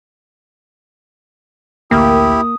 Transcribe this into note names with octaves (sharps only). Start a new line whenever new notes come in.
A1 D2 A#3 E4 G4 G5 D#6